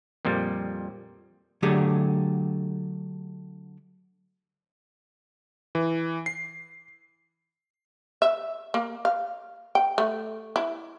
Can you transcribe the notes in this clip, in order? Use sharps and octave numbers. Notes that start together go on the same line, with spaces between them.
F2 A#2 F3 G3
D3 F#3 A3 D4 G4 G#4
E3
C7
E5
A#3
F5
G5
A3
E4